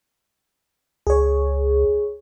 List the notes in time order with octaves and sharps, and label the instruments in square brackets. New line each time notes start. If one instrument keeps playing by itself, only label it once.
[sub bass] C#2 [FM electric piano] G#4 C#5